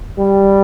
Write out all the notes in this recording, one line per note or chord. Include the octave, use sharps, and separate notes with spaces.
G3